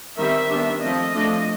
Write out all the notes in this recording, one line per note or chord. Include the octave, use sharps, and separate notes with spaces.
D#3 G3 C4 E5
D#3 G3 B3 D4
F3 A3 C4 D#5
F3 A3 D4